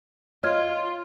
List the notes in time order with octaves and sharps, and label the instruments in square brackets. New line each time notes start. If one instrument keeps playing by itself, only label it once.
[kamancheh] F4 [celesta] C#5 F6 G#6 [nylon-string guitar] D#5